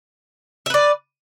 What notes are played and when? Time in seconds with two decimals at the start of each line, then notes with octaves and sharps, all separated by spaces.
0.66 E5
0.70 B4
0.74 D5